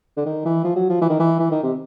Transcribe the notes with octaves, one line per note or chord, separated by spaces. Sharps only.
D3
D#3
E3
F3
F#3
F3
E3
D#3
E3
E3
D#3
C3